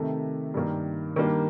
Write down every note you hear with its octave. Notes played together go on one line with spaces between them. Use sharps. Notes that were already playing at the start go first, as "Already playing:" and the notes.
Already playing: C3 D#3 A3
G2 D#3 A#3
D#3 G3 A#3 D4